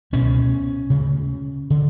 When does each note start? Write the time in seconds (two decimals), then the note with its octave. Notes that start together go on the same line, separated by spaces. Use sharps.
0.12 C#2 B2 C#4
0.90 D2 C#3
1.70 D3